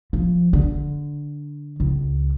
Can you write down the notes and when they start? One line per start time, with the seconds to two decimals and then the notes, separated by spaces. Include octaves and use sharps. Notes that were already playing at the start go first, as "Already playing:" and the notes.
0.13 F3
0.53 D3
1.80 C#2